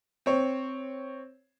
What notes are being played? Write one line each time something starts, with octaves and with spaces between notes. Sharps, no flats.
C4 C#5